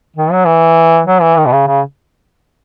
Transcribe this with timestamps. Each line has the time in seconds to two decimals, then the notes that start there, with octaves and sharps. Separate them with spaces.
0.17 D#3
0.32 F#3
0.46 E3
1.07 F#3
1.22 E3
1.38 D#3
1.46 B2
1.52 C#3
1.67 C#3